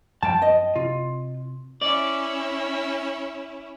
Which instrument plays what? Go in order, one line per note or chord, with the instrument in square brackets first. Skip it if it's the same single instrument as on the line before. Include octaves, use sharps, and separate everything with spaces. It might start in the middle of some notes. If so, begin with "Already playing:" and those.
[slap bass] F#2 F3 F#3 [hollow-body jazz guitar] G5 A5
[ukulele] D#5
[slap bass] C3 [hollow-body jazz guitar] F4
[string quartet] C#4 E4 C#5 [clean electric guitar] D5